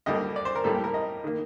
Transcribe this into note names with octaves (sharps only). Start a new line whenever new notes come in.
D2 D3 G3 A#3 D#5
D5
C5
A#4
A2 G3 A#3 A4
G4
A#4
D#5
D#3 A#3